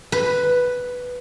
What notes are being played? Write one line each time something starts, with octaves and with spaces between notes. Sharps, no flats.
B4